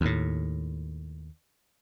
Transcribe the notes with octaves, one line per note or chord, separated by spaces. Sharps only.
D#2 A2